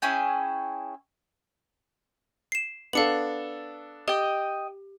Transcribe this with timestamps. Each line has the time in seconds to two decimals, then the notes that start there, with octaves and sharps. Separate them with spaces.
0.02 C#4 E4 G#4 G5
2.52 C7 E7
2.93 B3 D4 A4 F5 C#7 F#7
4.08 G4 D#5 G5